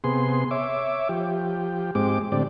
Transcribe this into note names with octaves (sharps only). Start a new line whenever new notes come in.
C3 B3 G#4 C6
C#5 E5 D6
F3 G4
G#2 G#3 C4 G4 D6
A2 D3 C4 G4 D5